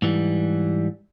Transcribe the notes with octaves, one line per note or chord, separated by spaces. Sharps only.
G#2 E3 G3